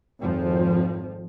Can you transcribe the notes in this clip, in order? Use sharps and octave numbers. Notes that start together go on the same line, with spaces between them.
G#1 F2 F3